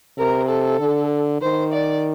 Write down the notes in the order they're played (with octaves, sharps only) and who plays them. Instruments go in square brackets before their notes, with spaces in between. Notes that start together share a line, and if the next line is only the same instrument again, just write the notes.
[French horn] C3 [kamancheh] A#4
[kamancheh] A4
[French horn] D3
[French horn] D#3 [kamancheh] C5
[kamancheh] D5